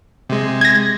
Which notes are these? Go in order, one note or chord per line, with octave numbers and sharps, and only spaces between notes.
C3 G#3
G#6 A#6